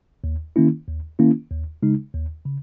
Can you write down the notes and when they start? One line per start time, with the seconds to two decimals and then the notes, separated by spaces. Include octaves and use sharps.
0.24 D#2
0.56 D#3 A#3 C#4 E4
0.88 D#2
1.19 D#3 A#3 C#4 E4
1.51 D#2
1.83 C#3 G#3 D#4
2.14 D#2
2.45 C#3